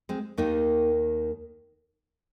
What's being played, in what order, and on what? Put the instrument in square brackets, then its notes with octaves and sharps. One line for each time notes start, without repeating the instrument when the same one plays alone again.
[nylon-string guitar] G#3 C4
D#2 D#3 A#3 D#4